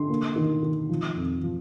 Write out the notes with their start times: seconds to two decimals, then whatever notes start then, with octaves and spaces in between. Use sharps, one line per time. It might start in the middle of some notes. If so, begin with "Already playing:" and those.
Already playing: D3 C6
0.10 A#3
0.36 D#3
0.63 D#3
0.89 F3
1.16 F2
1.43 F3